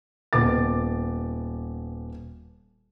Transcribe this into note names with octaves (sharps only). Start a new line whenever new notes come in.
D#1 B3 D6 A6